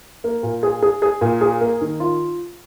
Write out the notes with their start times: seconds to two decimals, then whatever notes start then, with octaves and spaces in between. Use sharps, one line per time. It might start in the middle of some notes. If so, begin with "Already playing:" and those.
0.24 A#3
0.43 A#2
0.63 G#4
0.82 G#4
1.02 G#4
1.21 A#2
1.41 G#4
1.61 A#3
1.81 D#3
2.00 F4